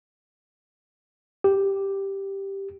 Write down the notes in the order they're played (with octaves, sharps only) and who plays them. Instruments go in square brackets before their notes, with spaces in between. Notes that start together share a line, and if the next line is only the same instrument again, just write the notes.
[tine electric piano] G4